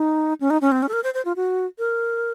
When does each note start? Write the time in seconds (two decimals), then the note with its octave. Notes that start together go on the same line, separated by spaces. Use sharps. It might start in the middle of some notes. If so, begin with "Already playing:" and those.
Already playing: D#4
0.41 C#4
0.50 D#4
0.61 C#4
0.72 C4
0.82 C#4
0.89 A4
0.93 A#4
1.04 C5
1.14 C5
1.25 F4
1.36 F#4
1.79 A#4